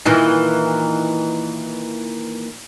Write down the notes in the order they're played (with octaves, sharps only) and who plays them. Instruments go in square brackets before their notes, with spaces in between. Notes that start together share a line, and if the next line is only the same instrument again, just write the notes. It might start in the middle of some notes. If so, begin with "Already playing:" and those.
[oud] A#2 D#3 E3